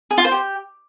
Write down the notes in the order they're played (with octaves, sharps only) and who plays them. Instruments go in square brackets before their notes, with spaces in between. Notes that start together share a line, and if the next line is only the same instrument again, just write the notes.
[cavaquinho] G#4
F4
C5
G4